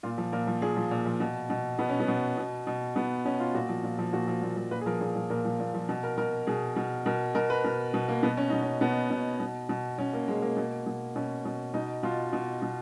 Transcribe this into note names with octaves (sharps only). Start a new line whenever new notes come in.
A#2 F4
F3
A#2 A#4
F3
A#2 G#4
F3
A#2
F3
B2
B2
B2 B3
C#4
B3
B2
B2
B2
B2 B3
B2 C#4
F4
A#2 F#4
F3
A#2
F3
A#2 F#4
F3
A#2
F3
A#2 B4
G#4
F3 A#4
A#2 G#4
F3
A#2 A#4
F3
A#2
F3
B2
A#4
B2 A#4
B2 G#4
B2
B2 A#4
B2 A#4
B4
B2 A#4
B2
A#3
B2 B3
C#4
B2 D#4
C#4
B2 B3
B2
B2
B2
B2 C#4
A#3
B2 G#3
A#3
B2
B2
B2 C#4
B2
B2 D#4
B2 F4
B2
B2